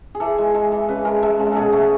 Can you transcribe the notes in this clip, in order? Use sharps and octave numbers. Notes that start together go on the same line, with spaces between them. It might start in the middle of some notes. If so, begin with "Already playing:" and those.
G#4
E3 A4
G#3
G#3 A4
E3
C#3 B4
G#3 A#4
G#3 A4
C#3
B2 G#4 A4
A3 A4